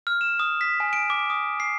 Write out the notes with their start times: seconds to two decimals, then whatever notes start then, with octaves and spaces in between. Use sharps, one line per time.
0.07 F6
0.21 E7
0.40 D#6
0.61 B6
0.80 G#5
0.93 D7
1.10 D6
1.30 D#6
1.60 C7